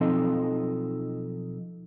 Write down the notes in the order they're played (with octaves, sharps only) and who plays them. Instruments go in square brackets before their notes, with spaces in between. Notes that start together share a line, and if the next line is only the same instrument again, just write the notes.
[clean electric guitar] B1 F3 C4 D#4 A4 D#5